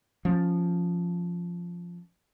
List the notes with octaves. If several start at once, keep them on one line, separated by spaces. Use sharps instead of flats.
F3 C#4